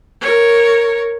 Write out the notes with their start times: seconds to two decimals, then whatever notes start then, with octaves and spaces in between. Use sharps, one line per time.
0.21 A#4 C#5